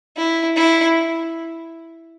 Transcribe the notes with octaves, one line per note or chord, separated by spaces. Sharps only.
E4
E4